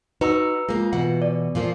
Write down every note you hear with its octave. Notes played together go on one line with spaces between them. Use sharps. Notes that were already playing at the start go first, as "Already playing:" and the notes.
D#4 F#4 B4 A#5 E6
G#3 A#3 F4
B2 E3 F#5
D5
A#2 F3 A#3